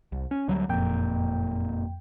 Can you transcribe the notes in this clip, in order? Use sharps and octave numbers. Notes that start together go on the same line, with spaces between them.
C2
C#4
D2 F#3 G3
F#1 F2 A#2 G5